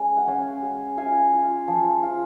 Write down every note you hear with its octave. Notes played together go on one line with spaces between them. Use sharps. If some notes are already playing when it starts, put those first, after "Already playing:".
Already playing: G#3 C#4
F#5
C#4 F5 G#5
G#3
F4 F5 G#5
F4
F3
F4